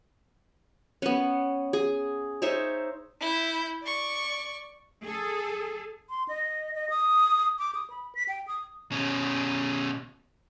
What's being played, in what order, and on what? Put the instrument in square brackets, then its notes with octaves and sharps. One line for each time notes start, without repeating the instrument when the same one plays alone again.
[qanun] B3 C#4
G#4
D#4 C5 C#5 E5
[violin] E4 G6
D5 C#6
[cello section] G#4 A4
[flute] C6
D#5
D#5
D#6
D6
D#6
B5
B6
G5
D#6
[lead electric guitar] B2 C#4